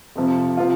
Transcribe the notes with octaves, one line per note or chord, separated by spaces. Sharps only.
F2 C3 F3
C3 F3 F4